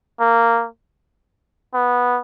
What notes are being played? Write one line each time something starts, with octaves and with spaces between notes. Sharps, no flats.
A#3
B3